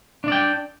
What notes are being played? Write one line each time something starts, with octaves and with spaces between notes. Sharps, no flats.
D4 D5 G5